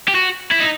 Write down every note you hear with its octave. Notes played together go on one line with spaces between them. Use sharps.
G4
F#4
E4
D#4